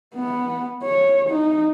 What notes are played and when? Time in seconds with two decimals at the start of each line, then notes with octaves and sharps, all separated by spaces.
0.15 B3
0.83 C#5
1.29 D#4